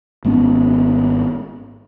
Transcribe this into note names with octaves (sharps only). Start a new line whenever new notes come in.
G#1 G#3 B3 C#4